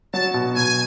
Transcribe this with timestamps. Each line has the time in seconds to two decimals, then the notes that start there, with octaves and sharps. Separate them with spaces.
0.13 F#3 A5
0.34 B2
0.56 B2 G#5